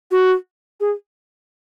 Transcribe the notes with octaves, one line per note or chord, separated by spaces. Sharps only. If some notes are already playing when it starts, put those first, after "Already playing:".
F#4
G#4